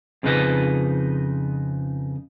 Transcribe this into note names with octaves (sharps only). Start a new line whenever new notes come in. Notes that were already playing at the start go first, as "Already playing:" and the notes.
F2 C#3 F3 D#4 B4 D#5